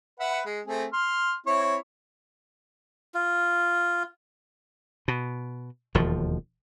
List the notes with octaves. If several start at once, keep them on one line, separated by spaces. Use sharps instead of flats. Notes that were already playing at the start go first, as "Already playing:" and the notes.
B4 E5 F#5
G#3
A3 C4 G#4
C6 F6
C4 E4 C#5
F4
B2
E1 D#2 F3